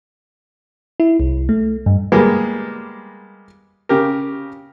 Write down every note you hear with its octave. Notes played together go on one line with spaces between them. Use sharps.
E4
C2
A3
G2
G3 G#3 A#3 B3
C#3 G4 A#4